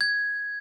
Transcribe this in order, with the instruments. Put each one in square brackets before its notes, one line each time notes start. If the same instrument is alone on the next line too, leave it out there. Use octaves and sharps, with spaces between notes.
[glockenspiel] G#6